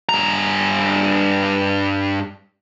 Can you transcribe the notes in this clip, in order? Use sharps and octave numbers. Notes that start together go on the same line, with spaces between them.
G2 A#5